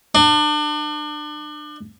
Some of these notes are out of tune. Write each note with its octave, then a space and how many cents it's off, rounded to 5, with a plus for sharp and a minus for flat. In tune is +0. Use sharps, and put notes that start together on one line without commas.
D4 +35